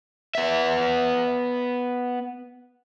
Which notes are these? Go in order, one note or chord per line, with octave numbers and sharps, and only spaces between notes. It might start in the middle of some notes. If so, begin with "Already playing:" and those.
B3 E5